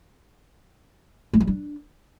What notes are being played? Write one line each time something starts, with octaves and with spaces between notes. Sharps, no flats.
G#3
G3
D4